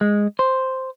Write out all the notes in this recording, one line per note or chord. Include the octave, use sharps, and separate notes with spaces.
G#3
C5